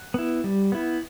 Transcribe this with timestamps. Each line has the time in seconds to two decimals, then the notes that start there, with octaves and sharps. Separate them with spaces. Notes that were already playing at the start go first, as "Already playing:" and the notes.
Already playing: F#5
0.14 B3 E4
0.44 G3
0.72 B3 E4